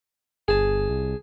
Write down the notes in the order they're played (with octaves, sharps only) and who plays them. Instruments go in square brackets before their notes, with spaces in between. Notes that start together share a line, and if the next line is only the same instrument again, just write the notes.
[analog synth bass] G1 [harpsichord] G#4 A5
[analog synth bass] C2